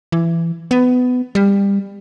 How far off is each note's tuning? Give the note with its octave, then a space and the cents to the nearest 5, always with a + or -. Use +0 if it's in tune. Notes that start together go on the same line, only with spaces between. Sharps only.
E3 +20
B3 +20
G3 +25